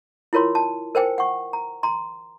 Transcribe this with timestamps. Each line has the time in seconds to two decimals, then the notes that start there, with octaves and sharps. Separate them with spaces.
0.33 E4 F4 A#4 C#5 C6
0.55 A5
0.95 A#4 C5 G5 G#5
1.18 F#5 C#6
1.53 A#5
1.83 A#5 C6